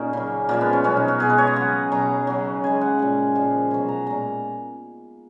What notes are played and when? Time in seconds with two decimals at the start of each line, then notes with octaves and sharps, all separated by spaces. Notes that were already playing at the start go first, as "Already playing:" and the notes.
Already playing: A#2 A#3 C#4 D#4 G#4
0.13 C#3 F#3
0.49 A#2 F3 G#3 A#3
0.61 B3
0.73 C#4
0.84 B2 F#3 C#4
0.97 D#4
1.08 F#4
1.20 B2 G#3 G#4
1.30 B4
1.38 C#5
1.47 D#5
1.56 C#3 F#3 F#5
1.92 B2 F#3 A#5
2.27 C#3 F#3
2.64 C#3 G#3 G#5
2.81 F#5
2.99 A#2 G#3
3.35 A#2 F3 G#3
3.71 B2 F#3 G#5
3.89 A#5
4.06 A#2 G#3 A#5